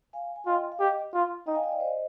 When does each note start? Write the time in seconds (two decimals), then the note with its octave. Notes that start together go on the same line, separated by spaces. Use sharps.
0.13 F5 G#5
0.36 G#5
0.46 F4 D#5 G5
0.72 F5
0.80 G4 D#5 G5
1.14 F4
1.46 D#4 D#5 G5
1.55 F5 G#5
1.63 D#5 G5
1.72 D5 F5
1.80 C5 D#5